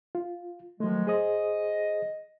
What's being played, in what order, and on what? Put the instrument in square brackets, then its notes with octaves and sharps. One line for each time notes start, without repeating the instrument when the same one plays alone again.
[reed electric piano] F4
[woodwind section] D#3 F3 G#3 [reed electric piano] F#3 A3
[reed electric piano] G#4 C5 D#6 [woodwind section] D#5